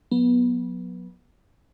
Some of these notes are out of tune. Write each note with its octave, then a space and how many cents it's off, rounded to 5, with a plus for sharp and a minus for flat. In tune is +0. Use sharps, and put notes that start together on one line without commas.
F#3 -35 B3 -20